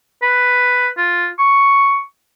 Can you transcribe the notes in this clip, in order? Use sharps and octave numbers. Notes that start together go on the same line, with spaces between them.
B4
F4
C#6